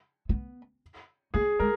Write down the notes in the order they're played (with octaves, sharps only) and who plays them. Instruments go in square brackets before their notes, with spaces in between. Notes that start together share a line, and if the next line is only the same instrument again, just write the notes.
[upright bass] B3
[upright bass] A#3 [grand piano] G#4
[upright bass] G#3 [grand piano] A#4